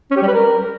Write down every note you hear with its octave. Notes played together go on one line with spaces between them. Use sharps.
C#4
G4
G3
B4
A#4